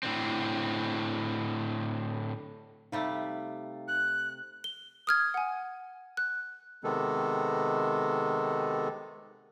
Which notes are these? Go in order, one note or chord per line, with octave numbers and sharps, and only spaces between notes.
A2 D3 C4
C3 G3 A3 D#4 F5
F#6
G7
D#6 F6 G#6
F#5 G#5
F#6
C3 D#3 G#3 B3 A4